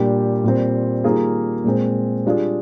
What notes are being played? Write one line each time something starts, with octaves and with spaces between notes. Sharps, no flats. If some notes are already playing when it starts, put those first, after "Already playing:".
Already playing: A#2 G3 D4 G4
A#2 G3 C4
D#3 G3 A#3 F4 G#4
A#2 G#3 C4
G3 D4 F4 G#4